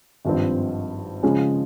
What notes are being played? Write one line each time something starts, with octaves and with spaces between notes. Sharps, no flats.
G#1 G2 F3 C4
C#3 F3 G#3 C#4